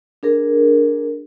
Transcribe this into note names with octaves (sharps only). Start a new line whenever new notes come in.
D4 G#4 A#4